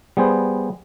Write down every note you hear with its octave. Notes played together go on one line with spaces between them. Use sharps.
G3 B3 G#4 C5